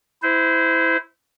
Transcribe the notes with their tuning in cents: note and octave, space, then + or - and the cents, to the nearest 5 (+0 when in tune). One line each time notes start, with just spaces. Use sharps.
E4 -5 C5 -25